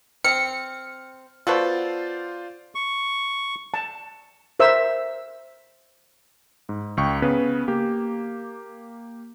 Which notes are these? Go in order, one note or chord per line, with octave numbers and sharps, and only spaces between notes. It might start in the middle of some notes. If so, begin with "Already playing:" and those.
C4 F6 C#7
B3 F4 F#4 A4 C5 D5
C#6
A5
A#4 C5 E5 E6
G#2
C#2 G5 C#6
C#3 B3 B4
A#3 G4